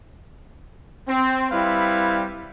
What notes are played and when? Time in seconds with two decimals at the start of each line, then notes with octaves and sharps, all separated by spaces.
1.09 C4
1.52 G3 C4 E4 B4 F5